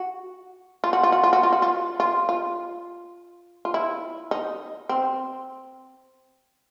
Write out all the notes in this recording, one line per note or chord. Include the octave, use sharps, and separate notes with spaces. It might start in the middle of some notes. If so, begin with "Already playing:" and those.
Already playing: F#4
F4
F#4
F4
F#4
F4
F#4
F4
F#4
F4
F4
F4
F4
E4
D#4
C4